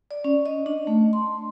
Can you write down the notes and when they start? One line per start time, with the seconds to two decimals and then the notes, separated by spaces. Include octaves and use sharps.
0.11 D5
0.24 C#4
0.46 D#5
0.66 D4
0.87 A3
1.13 C6